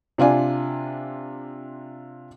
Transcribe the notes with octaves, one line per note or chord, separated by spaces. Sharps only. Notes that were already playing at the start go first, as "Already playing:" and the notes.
C3 D4 F4 G#5